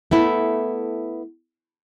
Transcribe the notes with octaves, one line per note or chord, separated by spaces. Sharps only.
A3 B3 E4